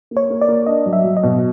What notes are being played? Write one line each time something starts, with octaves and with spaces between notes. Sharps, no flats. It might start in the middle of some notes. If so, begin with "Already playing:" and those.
A#3
C#5
A#3
D5
A#3
D4 D#5
F#3
E5
F#3
D#5
B2